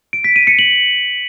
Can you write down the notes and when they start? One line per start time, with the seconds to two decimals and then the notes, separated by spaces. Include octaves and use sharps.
0.13 D7
0.24 B6
0.36 D#7
0.47 C#7
0.59 F#7